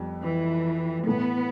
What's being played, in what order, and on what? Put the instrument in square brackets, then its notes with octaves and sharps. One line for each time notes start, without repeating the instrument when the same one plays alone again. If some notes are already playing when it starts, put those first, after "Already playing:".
Already playing: [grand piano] F2 G3 B3
[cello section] E3
[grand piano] A2 E3 A3 [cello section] B3